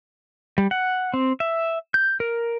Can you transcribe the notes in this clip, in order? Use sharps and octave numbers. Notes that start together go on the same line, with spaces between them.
G3
F#5
C4
E5
G6
A#4